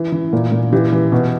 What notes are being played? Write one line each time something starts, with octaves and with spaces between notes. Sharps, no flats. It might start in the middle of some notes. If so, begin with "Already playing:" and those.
Already playing: E3
E3
A#2
A#2
E3 G4
E3
B2